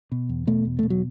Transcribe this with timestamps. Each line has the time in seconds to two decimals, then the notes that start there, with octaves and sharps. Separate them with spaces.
0.12 B2
0.29 E2
0.47 B2 A3
0.65 E2
0.79 B2 A3
0.90 F#3